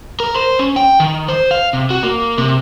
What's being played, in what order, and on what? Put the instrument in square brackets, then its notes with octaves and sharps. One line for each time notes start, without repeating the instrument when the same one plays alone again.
[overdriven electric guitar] A#4
C5
C#4
G5
D#3
C5
F5
C3
F#4
A#3
C3